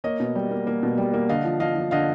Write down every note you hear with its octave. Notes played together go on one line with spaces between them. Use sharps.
A#3 C#5 D#5
B2
G3
A#3
A#3
B2
G3
A#3
D3 D#5 F5
F3
F3 D#5 F5
F3
D3 D#5 F5